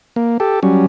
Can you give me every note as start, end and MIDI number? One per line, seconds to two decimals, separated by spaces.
0.16 0.37 58
0.40 0.60 67
0.40 0.60 69
0.63 0.86 54
0.63 0.86 55
0.63 0.86 61